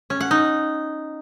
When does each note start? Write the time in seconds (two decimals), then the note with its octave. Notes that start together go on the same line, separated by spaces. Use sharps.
0.10 C#4
0.20 F#5
0.31 D#4